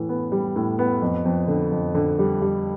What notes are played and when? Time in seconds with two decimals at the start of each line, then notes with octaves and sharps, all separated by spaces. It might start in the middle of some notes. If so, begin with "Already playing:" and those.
Already playing: A2 E3
0.09 B3
0.32 G3
0.56 A2
0.79 B3
1.02 F2
1.25 F2
1.48 D3
1.72 F2
1.95 D3
2.19 G3
2.42 G3